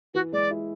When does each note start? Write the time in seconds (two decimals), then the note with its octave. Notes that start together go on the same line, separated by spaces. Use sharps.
0.14 E3 F#4
0.32 G#3 D5
0.50 E4